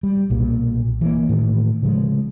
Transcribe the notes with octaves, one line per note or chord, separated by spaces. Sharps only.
G3
B1 A#2
E3 A#3
A2 D#3
C#3 F3 G#3